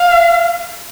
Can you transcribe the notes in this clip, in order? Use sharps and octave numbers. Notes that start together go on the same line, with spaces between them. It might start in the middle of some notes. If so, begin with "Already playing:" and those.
Already playing: F5